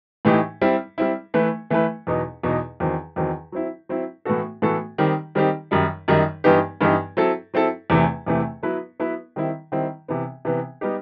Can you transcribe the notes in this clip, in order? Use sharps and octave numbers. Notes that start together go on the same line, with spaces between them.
A2 E3 A3 D#4 G4
G3 C4 E4
G3 C4 E4
E3 A3 E4 B4
E3 A3 E4 B4
E2 B2 F#3 B3 D#4
E2 B2 F#3 B3 D#4
E2 D#3 F#3 C4
E2 D#3 F#3 C4
F#3 C4 E4
F#3 C4 E4
A2 E3 B3 F#4 A4
A2 E3 B3 F#4 A4
D#3 G3 C4 D#4 G4
D#3 G3 C4 D#4 G4
F#2 D#3 G3 D#4
F#2 D#3 G3 D#4
G2 E3 B3 D#4 G4
G2 E3 B3 D#4 G4
F#3 C4 E4 A4
F#3 C4 E4 A4
E2 C3 E3 A3
E2 C3 E3 A3
F#3 B3 E4 B4
F#3 B3 E4 B4
D#3 G3 C4 E4
D#3 G3 C4 E4
C3 E3 B3
C3 E3 B3
G3 B3 D#4 G4